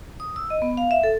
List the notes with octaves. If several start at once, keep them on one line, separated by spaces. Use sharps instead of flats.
D#6
E6
D#5
B3
F5
E5
A4